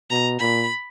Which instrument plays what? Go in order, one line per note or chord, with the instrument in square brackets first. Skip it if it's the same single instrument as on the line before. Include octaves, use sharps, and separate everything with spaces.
[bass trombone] B2 [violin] A#5
[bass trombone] A#2 [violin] B5